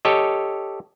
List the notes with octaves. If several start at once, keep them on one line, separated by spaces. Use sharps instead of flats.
G4 A4 C#5 D#5